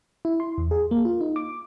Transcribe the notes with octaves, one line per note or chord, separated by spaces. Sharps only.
E4
C6
E2
G#4
A#3
F4
D#4
D6